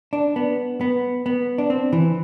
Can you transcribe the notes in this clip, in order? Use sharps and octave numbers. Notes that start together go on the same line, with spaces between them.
D4
B3
B3
B3
D4
C4
E3